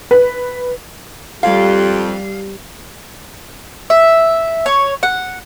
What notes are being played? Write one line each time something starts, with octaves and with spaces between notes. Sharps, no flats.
B4
F2 G3 G4 F5
E5
C#5
F#5